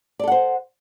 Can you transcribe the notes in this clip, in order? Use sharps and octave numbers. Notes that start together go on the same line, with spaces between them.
A4 C5 D5 F#5